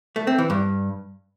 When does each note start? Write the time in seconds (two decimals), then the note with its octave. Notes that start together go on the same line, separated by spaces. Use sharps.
0.16 A3
0.27 C4
0.38 E3
0.50 G2